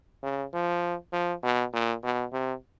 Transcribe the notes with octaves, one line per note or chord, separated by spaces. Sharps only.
C#3
F3
F3
B2
A#2
B2
C3